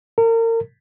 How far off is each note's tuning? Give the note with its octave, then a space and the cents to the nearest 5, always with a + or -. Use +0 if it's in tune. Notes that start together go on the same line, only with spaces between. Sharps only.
A#4 -35